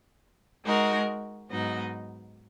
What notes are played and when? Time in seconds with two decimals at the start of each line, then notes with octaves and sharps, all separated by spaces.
0.65 G#3 D#4 F#4 A#4
1.50 G#2 F#3 B3 D#4